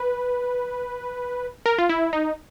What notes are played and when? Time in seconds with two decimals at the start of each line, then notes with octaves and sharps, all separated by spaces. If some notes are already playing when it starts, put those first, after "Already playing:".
Already playing: B4
1.66 A#4
1.78 F4
1.89 E4
2.13 D#4